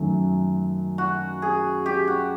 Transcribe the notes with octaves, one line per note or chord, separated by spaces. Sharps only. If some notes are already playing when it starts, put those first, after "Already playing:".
Already playing: F#2 D#3 F#3 A3
F#4
G#4
G4
F#4